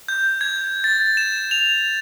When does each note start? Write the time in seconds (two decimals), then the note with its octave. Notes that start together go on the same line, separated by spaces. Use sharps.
0.08 G6
0.41 G#6
0.84 A6
1.17 E7
1.51 F7
1.66 F7